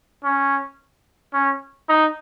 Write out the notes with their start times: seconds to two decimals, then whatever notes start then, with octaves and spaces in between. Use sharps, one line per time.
0.24 C#4
1.34 C#4
1.89 D#4